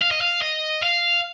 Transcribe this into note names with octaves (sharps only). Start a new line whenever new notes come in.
F5
D#5
F5
D#5
F5